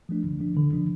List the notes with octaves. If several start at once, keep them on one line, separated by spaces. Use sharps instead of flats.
F3 A3 D4
D3
F3 D4
D3
F3 D4